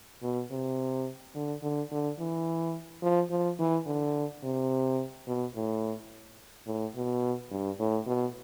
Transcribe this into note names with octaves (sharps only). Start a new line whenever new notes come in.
B2
C3
D3
D3
D3
E3
F3
F3
E3
D3
C3
B2
A2
A2
B2
G2
A2
B2